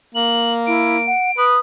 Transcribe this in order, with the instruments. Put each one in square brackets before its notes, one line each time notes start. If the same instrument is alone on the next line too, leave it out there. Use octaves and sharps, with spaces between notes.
[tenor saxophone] A#3 [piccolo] F#7
[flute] E4 [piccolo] D7
[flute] F#5
[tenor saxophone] B4 [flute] D#6